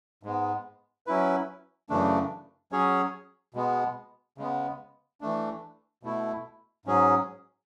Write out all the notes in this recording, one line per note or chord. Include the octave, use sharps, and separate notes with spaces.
G#2 G#3 B3
F#3 C#4 E4 B4
F#2 C#3 E3 A3 D4
F#3 C#4 G#4 C#5
B2 G#3 B3
C#3 G#3 B3
E3 A3 D4
B2 A3 E4
G#2 F#3 C#4 G#4